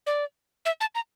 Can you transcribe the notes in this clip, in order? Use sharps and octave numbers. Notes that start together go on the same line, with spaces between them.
D5
E5
A5
A#5